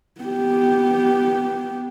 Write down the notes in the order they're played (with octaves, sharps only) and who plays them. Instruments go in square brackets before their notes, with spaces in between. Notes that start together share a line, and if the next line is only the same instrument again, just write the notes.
[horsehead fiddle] B3 G4